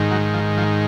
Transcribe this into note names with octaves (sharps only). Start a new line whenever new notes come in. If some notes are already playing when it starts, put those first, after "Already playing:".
Already playing: G#2 D#3
F#3
F3
F3